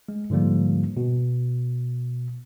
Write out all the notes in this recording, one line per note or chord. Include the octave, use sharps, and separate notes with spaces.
G#3
G#2 D3 F3 G3 A#3
B2